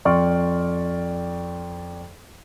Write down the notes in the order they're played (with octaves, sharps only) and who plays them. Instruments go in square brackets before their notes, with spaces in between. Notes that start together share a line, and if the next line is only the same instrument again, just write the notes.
[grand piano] F2 D5 C6 C#6 F6